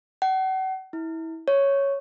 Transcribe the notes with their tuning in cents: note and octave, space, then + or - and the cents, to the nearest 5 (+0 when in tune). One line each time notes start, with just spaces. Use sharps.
F#5 +40
E4 -25
C#5 +0